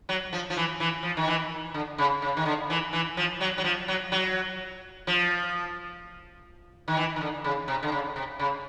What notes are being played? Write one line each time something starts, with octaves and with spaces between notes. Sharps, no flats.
F#3
F3
F3
E3
E3
F3
D#3
E3
D3
C#3
C#3
D#3
D3
E3
E3
F3
F#3
F#3
F3
F#3
F#3
F3
D#3
E3
D#3
D3
C#3
C3
D3
C#3
C3
C#3